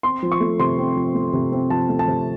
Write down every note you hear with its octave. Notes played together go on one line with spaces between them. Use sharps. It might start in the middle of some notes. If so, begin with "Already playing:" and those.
C4 C6
F3
C#6
A3
C3 C6
C4
F3
A3
C3
C4
F3 A5
A3
A5
C3